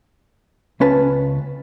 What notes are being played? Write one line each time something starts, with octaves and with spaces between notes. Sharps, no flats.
C#2 C#4 B4 A5